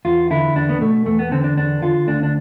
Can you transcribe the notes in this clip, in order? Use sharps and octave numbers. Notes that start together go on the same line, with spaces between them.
E2 F4
D3 E4
E2 D4
B3
B2 A3
E2 A3
B3
D3 C4
D4
E2 D4
D3 F4
D2 D4
D4